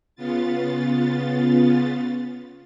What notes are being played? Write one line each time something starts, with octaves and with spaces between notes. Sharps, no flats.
C#3 B3 F4 A6